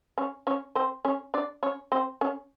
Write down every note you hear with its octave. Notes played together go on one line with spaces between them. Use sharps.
C#4 C#5
C#4 C#5
C4 C5
C#4 C#5
D4 D5
C#4 C#5
C4 C5
C#4 C#5